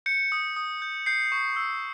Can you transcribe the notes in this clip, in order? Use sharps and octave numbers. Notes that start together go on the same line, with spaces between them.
G6 C#7
D#6
D#6
G6
G6 C7
C#6
E6